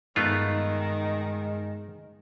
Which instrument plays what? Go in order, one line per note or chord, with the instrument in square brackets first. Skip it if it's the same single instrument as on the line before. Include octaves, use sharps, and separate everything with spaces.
[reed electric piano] G2 D#4 [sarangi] D#3 [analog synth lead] G#3 [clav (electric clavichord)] A3 B3 F4